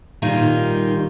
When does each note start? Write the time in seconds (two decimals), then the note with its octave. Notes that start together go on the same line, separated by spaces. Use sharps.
0.22 A#2 D#3 G3 D#4 F4